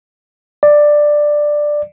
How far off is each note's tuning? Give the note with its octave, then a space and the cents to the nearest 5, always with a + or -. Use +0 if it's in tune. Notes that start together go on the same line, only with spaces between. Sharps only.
D5 +10